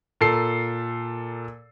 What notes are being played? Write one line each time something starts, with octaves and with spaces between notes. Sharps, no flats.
A#2 A4 C7